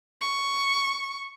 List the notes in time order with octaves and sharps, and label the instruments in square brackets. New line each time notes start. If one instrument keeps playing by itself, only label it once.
[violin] C#6